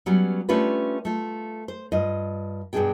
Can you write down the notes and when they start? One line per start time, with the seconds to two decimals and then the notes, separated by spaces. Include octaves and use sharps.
0.06 F#3 G3 B3 C#4
0.49 A3 C#4 D4 F4 G4 B4
1.05 A3 F4
1.68 C5
1.92 G2 F4 D#5
2.73 G2 B2 D#3 D4 G#4 G5